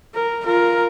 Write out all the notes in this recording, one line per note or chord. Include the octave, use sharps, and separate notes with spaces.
A#4
F4 A#4